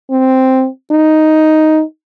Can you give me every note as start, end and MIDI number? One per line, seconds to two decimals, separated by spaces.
0.10 0.68 60
0.91 1.82 63